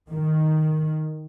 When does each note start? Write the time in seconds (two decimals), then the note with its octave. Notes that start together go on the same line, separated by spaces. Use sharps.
0.11 D#3